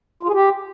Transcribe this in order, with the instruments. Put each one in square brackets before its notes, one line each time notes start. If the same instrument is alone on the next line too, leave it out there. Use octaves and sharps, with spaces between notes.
[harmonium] F4
G#4
G4